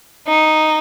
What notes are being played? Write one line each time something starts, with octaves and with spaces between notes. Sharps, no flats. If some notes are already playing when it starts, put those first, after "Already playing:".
D#4